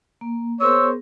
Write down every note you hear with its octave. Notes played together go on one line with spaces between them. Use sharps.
A#3
B3 G#4 A#4 C5 C#5 E6